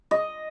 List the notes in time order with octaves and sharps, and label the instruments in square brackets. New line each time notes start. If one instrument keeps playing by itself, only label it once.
[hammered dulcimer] D#5